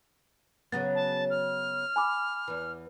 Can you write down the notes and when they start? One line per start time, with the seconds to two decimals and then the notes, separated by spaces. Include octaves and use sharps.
0.72 C#3 F#3 B3 A6
0.95 A5
1.30 F6
1.96 G#5 B5 D6
2.48 E2 E3